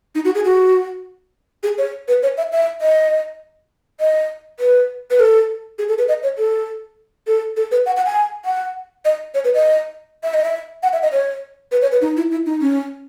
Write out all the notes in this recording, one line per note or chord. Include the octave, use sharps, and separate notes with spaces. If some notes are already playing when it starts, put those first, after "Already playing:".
D#4
F#4
G#4
F#4
G#4
C#5
B4
C#5
E5
E5
D#5
D#5
B4
B4
A4
G#4
A4
B4
D#5
C#5
A4
A4
A4
B4
F#5
F#5
G#5
F#5
D#5
C#5
B4
D#5
E5
D#5
E5
F#5
E5
D#5
C#5
B4
C#5
B4
D#4
E4
E4
D#4
C#4